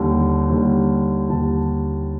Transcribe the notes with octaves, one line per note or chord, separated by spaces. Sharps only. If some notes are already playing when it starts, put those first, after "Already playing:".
Already playing: D#2 D3 G3
D#2 D3 G3
D#2 D3 G3 A5